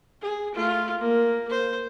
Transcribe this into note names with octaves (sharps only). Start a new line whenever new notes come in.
G#4
A3 F4
A#3
C5